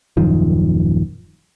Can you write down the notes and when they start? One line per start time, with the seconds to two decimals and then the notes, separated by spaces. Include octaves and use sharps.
0.17 D#1 F#2 D#3 F3